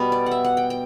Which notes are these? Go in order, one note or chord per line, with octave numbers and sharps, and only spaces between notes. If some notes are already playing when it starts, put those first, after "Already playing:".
Already playing: B2 G3 B3 B4
D5
F#5
E5
F#5
G5
G5